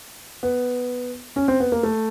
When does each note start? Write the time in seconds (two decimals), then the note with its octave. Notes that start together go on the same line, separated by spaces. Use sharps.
0.43 B3
1.36 C#4
1.48 C4
1.60 B3
1.72 A#3
1.83 A3